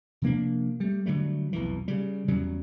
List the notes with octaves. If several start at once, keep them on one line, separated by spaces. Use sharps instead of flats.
C3 F3 A#3 D4
G3 A3
D3 F#3 G3 A3
B1 F2 E3
C#3 G3
E2 C#3 F#3 G3